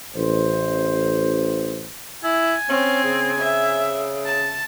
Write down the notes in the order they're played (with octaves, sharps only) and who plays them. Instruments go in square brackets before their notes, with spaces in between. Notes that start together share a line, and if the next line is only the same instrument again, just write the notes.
[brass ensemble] A1 C5
[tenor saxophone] E4 [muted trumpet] G#5
[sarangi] C4 [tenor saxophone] C#4
[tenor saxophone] C#3
[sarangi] E5
A5